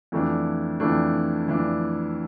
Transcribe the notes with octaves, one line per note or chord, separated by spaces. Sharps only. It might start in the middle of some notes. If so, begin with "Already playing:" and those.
F2 E3 A3 D4
F2 E3 A3 D4
F2 E3 A3 D4